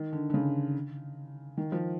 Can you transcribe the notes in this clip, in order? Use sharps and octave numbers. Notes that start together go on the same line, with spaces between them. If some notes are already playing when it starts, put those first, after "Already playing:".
Already playing: D#3
D3
D3
C#3
D#3
F3